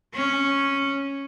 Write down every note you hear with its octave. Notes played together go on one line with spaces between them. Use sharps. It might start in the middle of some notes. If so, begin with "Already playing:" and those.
C#4